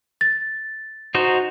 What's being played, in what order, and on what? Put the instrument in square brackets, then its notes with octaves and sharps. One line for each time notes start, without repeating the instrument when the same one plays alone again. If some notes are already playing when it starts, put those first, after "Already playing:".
[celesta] A6
[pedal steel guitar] D#4 F#4 C5